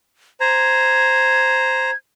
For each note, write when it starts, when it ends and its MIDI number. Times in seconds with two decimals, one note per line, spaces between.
0.41 1.91 72
0.41 1.91 82
0.41 1.96 92